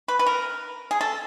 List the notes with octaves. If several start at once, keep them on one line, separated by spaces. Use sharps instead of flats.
B4
B4
A#4
G#4
A4